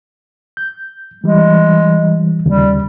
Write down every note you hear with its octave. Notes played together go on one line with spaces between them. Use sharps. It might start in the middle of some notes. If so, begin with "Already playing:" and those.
G6
E3 G3 G#3
D#2 C#3 G3